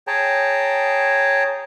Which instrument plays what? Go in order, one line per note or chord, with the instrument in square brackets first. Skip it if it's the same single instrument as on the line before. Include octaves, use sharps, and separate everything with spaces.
[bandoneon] G#4 C#5 G5 A5 A#5